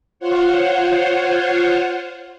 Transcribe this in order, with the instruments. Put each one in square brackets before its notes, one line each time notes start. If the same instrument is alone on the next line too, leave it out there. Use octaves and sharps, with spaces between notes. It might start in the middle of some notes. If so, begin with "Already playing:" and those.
[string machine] F4 C5 C#5 F#5